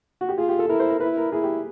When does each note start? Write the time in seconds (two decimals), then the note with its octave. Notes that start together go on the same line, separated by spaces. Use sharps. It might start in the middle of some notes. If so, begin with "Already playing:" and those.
0.21 F#4
0.29 G4
0.37 F4 G#4
0.49 G4
0.59 A4
0.69 E4 A#4
0.80 C5
0.90 A#4
1.00 E4 B4
1.17 A#4
1.32 E4 G#4
1.44 G4